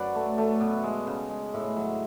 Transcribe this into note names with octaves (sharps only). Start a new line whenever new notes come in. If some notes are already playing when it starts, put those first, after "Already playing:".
Already playing: F#2 F#3 B4 D5
A3
A3
B2
G#3
C#3
G#3
A2 E5
F#3